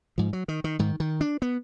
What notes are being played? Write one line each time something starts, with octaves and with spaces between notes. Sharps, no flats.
G#2 F3
F#3
D#3
D#3
G#2 D#3
D#3
D4
B3